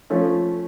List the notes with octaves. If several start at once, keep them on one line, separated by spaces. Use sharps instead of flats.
F3 A3 C#4